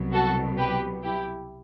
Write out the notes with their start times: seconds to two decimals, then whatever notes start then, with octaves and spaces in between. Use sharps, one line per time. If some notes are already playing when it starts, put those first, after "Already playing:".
Already playing: C2 B2 F#3
0.13 F#4 A4
0.58 G4 B4
1.03 E4 G4